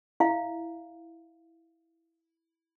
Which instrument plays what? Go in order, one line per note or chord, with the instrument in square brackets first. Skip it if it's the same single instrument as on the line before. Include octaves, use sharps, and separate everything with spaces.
[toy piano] E4 E5 F5